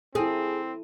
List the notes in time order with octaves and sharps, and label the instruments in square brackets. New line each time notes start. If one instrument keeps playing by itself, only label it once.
[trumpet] C4 [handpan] E4 A4 [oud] G#4